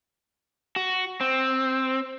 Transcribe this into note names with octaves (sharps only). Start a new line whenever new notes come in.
F#4
C4